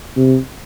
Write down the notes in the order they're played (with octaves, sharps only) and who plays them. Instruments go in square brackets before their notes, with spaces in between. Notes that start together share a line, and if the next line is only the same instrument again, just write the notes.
[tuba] C3